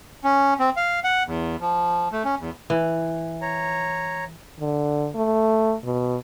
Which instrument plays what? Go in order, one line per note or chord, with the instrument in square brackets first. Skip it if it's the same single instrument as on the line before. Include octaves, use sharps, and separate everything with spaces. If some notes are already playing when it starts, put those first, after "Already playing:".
[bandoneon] C#4
C4
F5
F#5
E2
F3
A3
C#4
E2
[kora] E3
[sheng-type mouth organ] C#5 A#5
[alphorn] D3
A3
B2